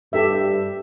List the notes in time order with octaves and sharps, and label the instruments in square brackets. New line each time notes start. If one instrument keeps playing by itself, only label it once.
[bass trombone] G2 [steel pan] G4 A4 E5